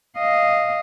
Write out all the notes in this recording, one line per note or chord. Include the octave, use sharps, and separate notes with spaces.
D#5 F5